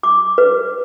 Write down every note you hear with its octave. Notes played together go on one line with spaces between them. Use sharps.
D6
B4